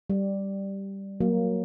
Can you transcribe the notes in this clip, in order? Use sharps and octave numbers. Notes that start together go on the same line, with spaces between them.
G3
F#3 A#3